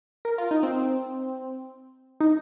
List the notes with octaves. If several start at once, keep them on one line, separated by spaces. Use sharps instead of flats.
A#4
F4
D#4
C4
D#4